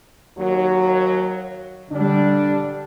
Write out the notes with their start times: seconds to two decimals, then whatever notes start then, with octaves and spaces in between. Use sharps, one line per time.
0.38 D#2 F#3
1.92 D3 G3 D4